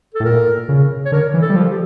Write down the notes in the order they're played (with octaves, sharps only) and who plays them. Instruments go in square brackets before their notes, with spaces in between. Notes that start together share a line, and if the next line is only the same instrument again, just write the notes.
[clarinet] A4
[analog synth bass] A2
[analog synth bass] A#2 [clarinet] A#4
[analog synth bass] C#3
[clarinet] C#5
[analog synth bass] D3 [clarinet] A#4
[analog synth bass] E3
[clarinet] A4
[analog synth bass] G3
F3
[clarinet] G4